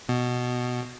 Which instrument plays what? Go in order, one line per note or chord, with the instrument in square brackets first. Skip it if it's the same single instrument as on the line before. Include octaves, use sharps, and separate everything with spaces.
[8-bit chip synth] B2